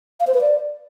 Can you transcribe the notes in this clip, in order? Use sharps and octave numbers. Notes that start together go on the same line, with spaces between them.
F5
C5
B4
D5